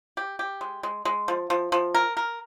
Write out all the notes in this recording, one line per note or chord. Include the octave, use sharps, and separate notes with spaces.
G4
G4
G#3
G#3
G#3
F3
F3
F3
A#4
A#4